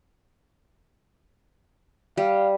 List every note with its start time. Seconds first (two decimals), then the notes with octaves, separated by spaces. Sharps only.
2.17 G3 F5